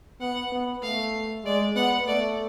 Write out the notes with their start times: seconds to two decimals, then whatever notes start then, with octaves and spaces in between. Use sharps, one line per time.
0.20 B3 F#5
0.52 B3
0.82 A3 F5
1.44 G#3 D5
1.75 B3 F#5
2.07 A3 D5